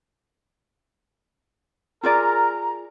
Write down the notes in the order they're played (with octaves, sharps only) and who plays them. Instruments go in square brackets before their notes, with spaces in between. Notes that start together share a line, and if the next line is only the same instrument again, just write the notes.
[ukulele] F4 G#4 D5 [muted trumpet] A#4 [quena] A#5